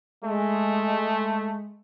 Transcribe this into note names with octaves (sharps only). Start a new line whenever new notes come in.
G#3 A3